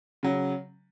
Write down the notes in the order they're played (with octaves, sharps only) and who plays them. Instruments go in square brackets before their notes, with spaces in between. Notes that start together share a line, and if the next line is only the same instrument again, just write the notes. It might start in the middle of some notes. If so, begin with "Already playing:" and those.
[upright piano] C#3 F#3